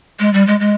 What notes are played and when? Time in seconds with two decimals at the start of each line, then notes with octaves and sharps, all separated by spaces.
0.19 G#3
0.33 G3
0.47 G#3
0.60 G#3